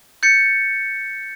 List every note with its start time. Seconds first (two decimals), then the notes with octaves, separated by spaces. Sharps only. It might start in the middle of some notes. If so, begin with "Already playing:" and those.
0.23 G6 A6 C#7